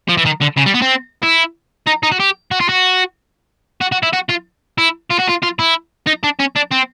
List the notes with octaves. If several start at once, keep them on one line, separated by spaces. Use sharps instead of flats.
F3
E3
D#3
D3
C#3
G3
B3
C4
E4
D#4
D#4
F#4
G4
F#4
F4
F#4
F#4
F#4
E4
F#4
F4
E4
F4
F#4
F4
F4
E4
D#4
D4
C#4
D4
C4